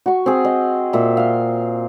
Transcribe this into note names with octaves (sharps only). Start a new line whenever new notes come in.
F#4 C#6
C4 G#4
D#5
A#2 E5
F5 C6